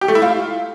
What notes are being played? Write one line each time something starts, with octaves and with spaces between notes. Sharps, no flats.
G4
A3
E4
F4